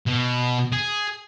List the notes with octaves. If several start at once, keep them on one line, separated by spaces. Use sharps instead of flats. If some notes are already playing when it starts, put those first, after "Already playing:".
B2
G#4